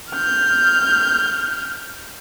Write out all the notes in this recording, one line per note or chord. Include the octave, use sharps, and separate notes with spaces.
F6 G6